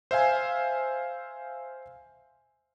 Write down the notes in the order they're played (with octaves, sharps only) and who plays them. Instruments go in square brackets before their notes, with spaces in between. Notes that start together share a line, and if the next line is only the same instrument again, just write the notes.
[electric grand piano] C5 E5 F5 G#5